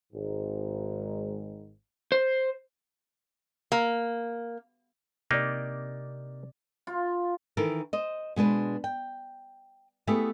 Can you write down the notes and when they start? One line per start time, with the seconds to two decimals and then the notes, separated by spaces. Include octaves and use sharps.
0.13 G#1 G#2
2.12 C5
3.72 A#3
5.31 C3 A#3 D#4 G4 D5
6.87 F4
7.57 D#3 E3 E4 A4 A#4
7.93 C5 D#5
8.36 B2 G#3 D4 B4 C5
8.84 G5
10.07 A3 B3 E4 G4 G#4